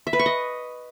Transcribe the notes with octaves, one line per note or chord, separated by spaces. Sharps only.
E5
B4
C#6
D#5